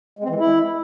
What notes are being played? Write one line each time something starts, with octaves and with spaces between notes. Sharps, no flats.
G#3
C4
E3
G#3
E4